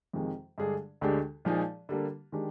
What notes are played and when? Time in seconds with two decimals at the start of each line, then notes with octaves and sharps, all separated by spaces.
0.13 F2 C3 D#3 G#3
0.58 G2 D3 G#3 D4 G#4
1.01 D2 D3 G#3 D4 G4
1.45 A#2 F3 G#3 D#4 G#4
1.89 D3 G3 A#3 D4
2.32 D#3 G#3 D4 G4